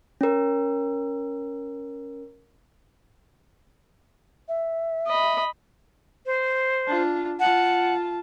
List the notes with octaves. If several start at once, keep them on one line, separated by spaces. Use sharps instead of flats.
C#4 A#4
E5
D#5 B5
C5
D4 F4
F4 F#5 A5